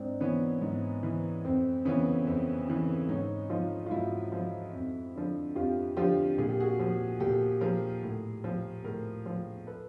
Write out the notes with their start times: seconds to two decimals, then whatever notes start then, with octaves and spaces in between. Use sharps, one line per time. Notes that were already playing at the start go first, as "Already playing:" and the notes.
Already playing: G#2 C4 D4
0.21 E3 B3 C#4
0.62 G#2
1.03 E3
1.44 F2 C4
1.85 C#3 E3 B3 C#4
2.27 F2 C4
2.68 C#3 E3
3.09 G#2 C#4 D#4
3.50 F3 D#4 F4
3.86 F4
3.91 G#2 E4 F#4
4.32 F3
4.73 F2
5.15 D3 F3
5.55 F2 F4 G4
5.97 D3 F3 F4 G4
6.38 A#2 G#4
6.49 G4
6.60 F#4 G#4
6.80 F3
7.20 A#2 G4 A4
7.61 F3 G#4 A#4
8.03 A2
8.44 F3
8.84 A2 G#4 A#4
9.26 F3
9.67 A4 B4